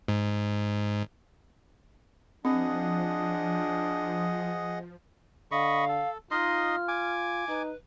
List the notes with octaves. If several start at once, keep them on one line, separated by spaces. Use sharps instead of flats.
G#2
F3 C4 D4 G#4 D#5 F#5
D3 D#5 F5 B5 C#6
A4
D#4 F4 D#5 C6 F6
G#5 D6
D#4 B4